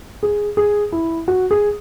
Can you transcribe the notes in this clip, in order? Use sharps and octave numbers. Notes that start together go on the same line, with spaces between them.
G#4
G#4
E4
F#4
G#4